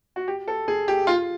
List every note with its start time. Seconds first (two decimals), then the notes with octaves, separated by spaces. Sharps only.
0.16 F#4
0.28 G4
0.48 A4
0.68 G#4
0.88 G4
1.07 F4